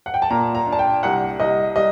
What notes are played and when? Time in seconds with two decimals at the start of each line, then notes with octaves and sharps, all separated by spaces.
0.06 F#5
0.14 G5
0.22 A5
0.30 A#2 A#5
0.55 A#5
0.67 D4
0.72 A5
0.79 G5
1.03 C2 F#5
1.40 C2 D#5
1.76 G3 D#5